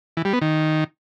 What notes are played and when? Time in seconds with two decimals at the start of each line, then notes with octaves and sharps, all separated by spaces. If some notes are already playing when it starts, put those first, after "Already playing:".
0.17 E3
0.25 G3
0.33 B3
0.42 D#3